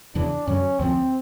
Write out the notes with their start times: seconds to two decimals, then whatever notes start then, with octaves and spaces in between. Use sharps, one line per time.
0.15 E2 C#3 E3 D4
0.47 F#2 D3 F#3 C#4
0.79 D2 D3 F3 C4